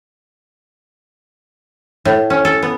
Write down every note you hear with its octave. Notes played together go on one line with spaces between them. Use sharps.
A2
C#4
A4
B3